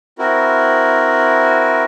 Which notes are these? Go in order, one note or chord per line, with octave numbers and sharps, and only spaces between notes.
C4 E4 F#4 A#4